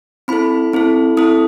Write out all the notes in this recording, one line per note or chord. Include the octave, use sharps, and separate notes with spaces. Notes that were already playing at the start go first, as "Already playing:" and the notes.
C4 E4 A4 B5
C4 E4 A4
C4 E4 A4 D#6